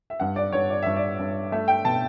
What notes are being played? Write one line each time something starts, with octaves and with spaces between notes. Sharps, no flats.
E5
G2 F#5
D5
G2 C#5
D5
G2 E5
D5
G2
A3 E5
G5
B2 A5